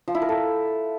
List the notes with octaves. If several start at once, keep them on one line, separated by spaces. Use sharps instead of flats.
F3
E4
A#4
A4